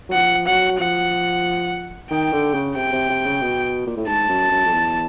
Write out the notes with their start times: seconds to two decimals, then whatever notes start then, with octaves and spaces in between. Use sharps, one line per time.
0.09 F#3
0.13 F3 F#5
0.47 F#3 F#5
0.79 F3 F#5
2.11 D#3 G5
2.33 D3
2.54 C#3
2.76 C3 G5
2.93 C3
3.10 C3
3.25 C#3
3.42 B2
3.87 A#2
3.97 A2
4.07 G#2 A5
4.29 F#2
4.51 F#2
4.65 F2
4.73 E2